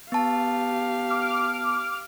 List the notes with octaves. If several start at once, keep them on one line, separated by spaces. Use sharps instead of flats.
B3 G4 F5 A5
D6 F6